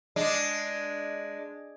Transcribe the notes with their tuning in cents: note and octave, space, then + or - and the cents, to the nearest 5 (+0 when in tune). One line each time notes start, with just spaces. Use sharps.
G#3 +0 D4 +0